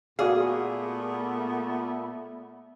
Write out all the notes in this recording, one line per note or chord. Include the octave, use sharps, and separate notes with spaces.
A#2 A3 B3 F#4 G#4 D5 F5